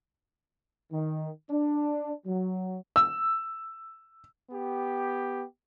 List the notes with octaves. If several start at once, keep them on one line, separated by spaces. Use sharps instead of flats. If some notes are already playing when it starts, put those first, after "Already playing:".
D#3
D4
F#3
E6
B3 G4